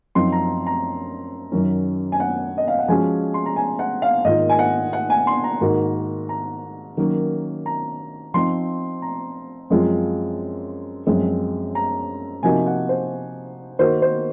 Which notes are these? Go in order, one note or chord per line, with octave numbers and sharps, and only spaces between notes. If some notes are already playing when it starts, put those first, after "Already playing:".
F#2 F3 C4 D#4 C6
A#5
A#5
F#2 D#3 F#3 C#4
G#5
F#5
D#5
F5
F#5
F3 G#3 C#4 F#4 G#5
C6
A#5
G#5
F#5
F5
G#2 D#3 A#3 F4 D#5
G#5
F#5
F#5
G#5
C6
A#5
G#2 D#3 A#3 D#4 F#4
A#5
D#3 F#3 A#3 C#4
A#5
F3 C4 D#4 C6
A#5
F#2 F3 G#3 C4 F4
F#2 F3 G#3 C4
A#5
C3 F3 A#3 D#4 F#4 G#5
F#5
C5
D#3 A#3 D#4 F#4 C5
C5